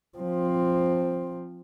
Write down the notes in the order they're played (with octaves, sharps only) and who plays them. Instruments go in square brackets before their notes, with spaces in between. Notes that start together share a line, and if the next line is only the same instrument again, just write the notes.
[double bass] F3 C4